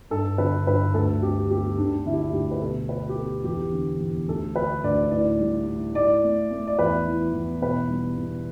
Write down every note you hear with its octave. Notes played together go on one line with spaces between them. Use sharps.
G2 A4
D3 B4
G2 B4
D2 A4
D3 G4
B3 G4
D2 D4
D3 E4
G4
E4
D2 G4
B4
B2 A4
B3 B4
G4
B3 A4
E2 G4
D3
E2
D2 A4
D3 B4
D2 D5
A2 D5
G3
A2
A2 D5
A3
A3
D5
E2 B4
E3
E2
B2 B4
G3
B2